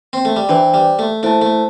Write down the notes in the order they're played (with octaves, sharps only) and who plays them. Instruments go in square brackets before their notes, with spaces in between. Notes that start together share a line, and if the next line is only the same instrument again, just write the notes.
[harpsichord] C4
A3
G3
[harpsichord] E3 [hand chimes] D4 C5 G5
[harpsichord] G3
A3
[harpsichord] A3 [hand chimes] E4 C5 A5
[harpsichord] A3